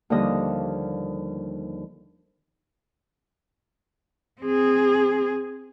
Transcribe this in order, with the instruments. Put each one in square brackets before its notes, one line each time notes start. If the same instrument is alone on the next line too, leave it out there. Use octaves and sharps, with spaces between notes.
[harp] D#2 D3 F3 G3 D#5
[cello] C4 G#4